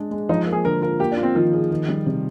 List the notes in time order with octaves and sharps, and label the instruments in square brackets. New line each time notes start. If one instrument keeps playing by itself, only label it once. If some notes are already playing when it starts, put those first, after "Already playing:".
Already playing: [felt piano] G#3 D4 G#4
G#3
[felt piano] F3 [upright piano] D#4
[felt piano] A#3
[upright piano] G#4
[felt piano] D3 [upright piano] A#4
[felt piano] F4 [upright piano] A#4
[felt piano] A#3 [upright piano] G4
[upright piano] D4
[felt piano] F4
[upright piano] C4
[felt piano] D#3 [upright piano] F3
[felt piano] G#4
D#3
G3
C3